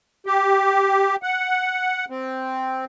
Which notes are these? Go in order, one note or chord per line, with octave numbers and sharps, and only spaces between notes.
G4
F#5
C4